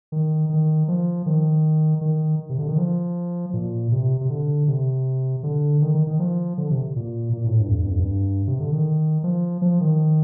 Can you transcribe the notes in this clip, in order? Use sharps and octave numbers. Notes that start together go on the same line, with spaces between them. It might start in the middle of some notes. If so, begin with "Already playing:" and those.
D#3
D#3
F3
D#3
D#3
C3
D3
D#3
F3
A#2
C3
C3
D3
C3
D3
D#3
D#3
D#3
F3
D3
C3
A#2
A#2
A2
G2
F2
G2
F2
G2
C3
D3
D#3
F3
F3
D#3